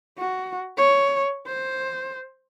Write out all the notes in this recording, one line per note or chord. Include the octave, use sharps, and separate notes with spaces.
F#4
C#5
C5